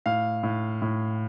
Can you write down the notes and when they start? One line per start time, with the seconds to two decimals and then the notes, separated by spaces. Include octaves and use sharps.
0.06 A2 F5
0.43 A2
0.82 A2